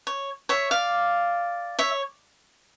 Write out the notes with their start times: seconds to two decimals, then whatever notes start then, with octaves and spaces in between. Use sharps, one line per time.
0.07 C#5
0.49 C#5 E5
0.71 D5 F5
1.79 C#5 E5